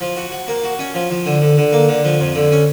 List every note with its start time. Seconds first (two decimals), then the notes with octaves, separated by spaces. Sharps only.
0.01 F3
0.16 F#4
0.32 F#4
0.48 A#3
0.64 F#4
0.79 C#4
0.95 F3
1.10 F3
1.26 D3
1.41 D3
1.57 D3
1.73 A#3
1.88 D3
2.04 F3
2.20 F2
2.35 D3
2.52 C#4